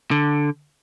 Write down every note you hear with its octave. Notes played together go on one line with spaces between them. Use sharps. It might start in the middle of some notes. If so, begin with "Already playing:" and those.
D3